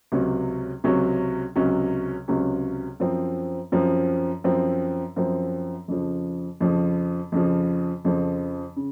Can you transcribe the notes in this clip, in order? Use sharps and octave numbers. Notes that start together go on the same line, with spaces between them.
C#2 C3 F#3 C#4
C#2 C3 F#3 C#4
C#2 C3 F#3 C#4
C#2 C3 F#3 C#4
F#2 F3 C4
F#2 F3 C4
F#2 F3 C4
F#2 F3 C4
F2 C#3 F3
F2 C#3 F3
F2 C#3 F3
F2 C#3 F3
C#3